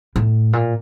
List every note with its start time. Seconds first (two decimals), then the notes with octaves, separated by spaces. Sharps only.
0.16 A2
0.53 A#2